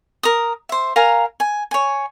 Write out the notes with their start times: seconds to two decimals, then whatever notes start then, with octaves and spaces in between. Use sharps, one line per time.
0.23 A#4 D#6
0.69 C5 E5
0.96 A#4 F5 G#5 A#5
1.40 G#5
1.71 C#5 G#5